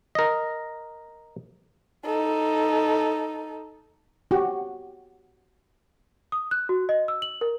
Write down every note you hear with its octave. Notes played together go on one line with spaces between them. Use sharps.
A#4 D#5
D#4 A4
F#4 G4
D#6
F#6
F#4
D#5
E6
F#7
A#4